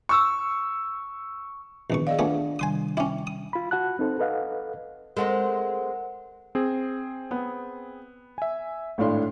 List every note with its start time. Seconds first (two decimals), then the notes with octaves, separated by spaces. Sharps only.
0.09 C#6 E6
1.90 A#1 E2 D#3 B3 C#6
2.07 G#4 D5 D#5 F5
2.19 A3 B3 D4 F4 G#4 F#5
2.59 C3 D#3 G3 G#5 C6 D#6
2.97 C#4 E4 G5 D6
3.27 D#6
3.53 F4 B5
3.71 F#4 F#5 A5 F#6
3.99 C4 D#4 A4 C5
4.19 A4 B4 D#5 F5 F#5
5.17 G#3 A3 C4 A#4 F#5
6.55 C4 G#4
7.31 B3
8.38 E5 G#5
8.98 G#1 A2 A3 D4 F5 C6